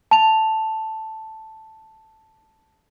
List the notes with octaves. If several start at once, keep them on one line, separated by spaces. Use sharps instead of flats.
A5 F7